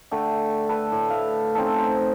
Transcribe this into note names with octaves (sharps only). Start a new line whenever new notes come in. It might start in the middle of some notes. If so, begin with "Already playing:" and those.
D3 A3 G5
A4 B4
A2
E5 F5
C4 C#4 D#4 A4
C5